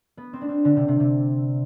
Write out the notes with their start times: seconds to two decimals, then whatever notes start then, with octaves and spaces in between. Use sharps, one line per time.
0.17 B3
0.33 C4
0.41 D4
0.49 C4
0.65 D3
0.76 C3
0.88 C3
1.00 C3